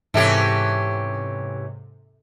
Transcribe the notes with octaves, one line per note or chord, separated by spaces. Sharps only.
G#2 C3 E3 C#4 G4 A4 E5 A5